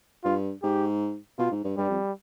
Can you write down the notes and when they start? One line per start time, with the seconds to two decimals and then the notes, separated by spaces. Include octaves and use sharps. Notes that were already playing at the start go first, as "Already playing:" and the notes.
0.24 G2 F4
0.63 G#2 G4
1.39 B2 F4
1.51 G#2
1.64 G2
1.77 G2 G3
1.90 F2